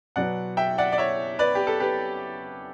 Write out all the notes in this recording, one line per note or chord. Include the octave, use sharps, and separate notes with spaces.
B2 F#3 B3 D5 F#5
E5 G5
D5 F#5
D5
C#5 E5
B4 D5
G4
A4
G4 B4